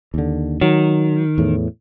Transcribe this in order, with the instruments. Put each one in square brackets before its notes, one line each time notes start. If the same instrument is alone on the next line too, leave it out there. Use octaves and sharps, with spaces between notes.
[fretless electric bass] D#2 D3
[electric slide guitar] D#3 [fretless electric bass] F#3
[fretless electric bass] E2 A2